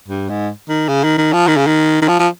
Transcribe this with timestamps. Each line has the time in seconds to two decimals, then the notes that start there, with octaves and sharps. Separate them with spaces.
0.08 G2
0.29 G#2
0.69 D#3
0.88 C#3
1.04 D#3
1.18 D#3
1.33 F3
1.48 D#3
1.57 C#3
1.67 D#3
2.02 D#3
2.08 F3
2.20 F3